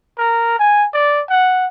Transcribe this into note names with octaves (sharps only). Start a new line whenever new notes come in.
A#4
G#5
D5
F#5